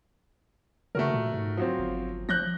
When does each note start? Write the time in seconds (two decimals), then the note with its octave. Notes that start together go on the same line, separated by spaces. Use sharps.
0.95 C#3 A3 F#4 A#4
1.14 A#2
1.34 G#2
1.57 F3 F#3 C4
1.79 G1
2.29 F3 F#6 G6 A#6